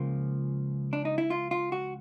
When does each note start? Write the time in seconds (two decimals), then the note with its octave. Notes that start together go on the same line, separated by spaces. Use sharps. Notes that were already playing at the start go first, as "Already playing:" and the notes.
Already playing: C#2 C#3 F3 A#3 F4
0.93 D4
1.05 D#4
1.18 E4
1.30 F4
1.51 F4
1.72 F#4